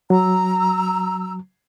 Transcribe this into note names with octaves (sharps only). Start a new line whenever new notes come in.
F#3 A#5 E6